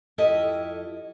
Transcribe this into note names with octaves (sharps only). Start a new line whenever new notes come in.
F2 E4 G4 A4 D#5